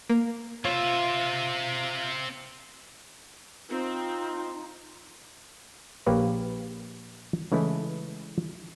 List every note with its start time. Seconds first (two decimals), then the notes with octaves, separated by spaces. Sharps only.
0.10 A#3
0.65 C4 F4 C#5 E5
3.69 C4 D#4 F4
6.06 A#1 A#3 G4 B4 C#5
7.52 C#3 E3 G#3 A3 E4